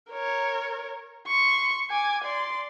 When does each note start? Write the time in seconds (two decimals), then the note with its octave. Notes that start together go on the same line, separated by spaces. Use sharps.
0.11 A#4 C#5
1.28 C6 C#6
1.91 G#5 D6
2.24 D5 C6